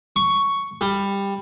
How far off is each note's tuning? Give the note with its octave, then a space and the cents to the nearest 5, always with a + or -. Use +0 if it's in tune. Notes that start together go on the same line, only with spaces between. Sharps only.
C#6 +5
G3 +15